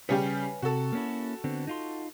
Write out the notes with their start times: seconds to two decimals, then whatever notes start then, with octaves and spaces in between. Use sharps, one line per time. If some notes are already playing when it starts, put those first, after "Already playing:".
0.09 C#3 G3 G4 B4 C#5 G#5
0.62 C3 F#4 A4
0.93 A#3 C#4 E4
1.44 D3 B3 C4
1.67 D#4 F4 C6